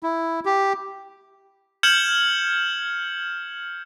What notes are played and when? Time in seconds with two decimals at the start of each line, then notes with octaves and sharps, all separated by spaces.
0.03 E4
0.45 G4
1.83 F6 G6 G#6 C#7 E7 F#7